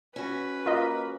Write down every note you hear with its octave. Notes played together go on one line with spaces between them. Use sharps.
C#4 F#4 B4
A#3 F4 A#4 D#5